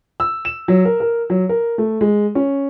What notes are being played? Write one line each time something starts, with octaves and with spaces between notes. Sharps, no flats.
E6
E7
F#3
A#4
A#4
F#3
A#4
A3
G#3
C#4